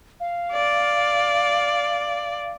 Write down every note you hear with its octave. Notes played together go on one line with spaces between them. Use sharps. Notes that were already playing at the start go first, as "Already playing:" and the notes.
F5
D5